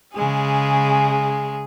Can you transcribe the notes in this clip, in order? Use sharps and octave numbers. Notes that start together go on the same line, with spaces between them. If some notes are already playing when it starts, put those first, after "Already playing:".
C#3 G#3 G#4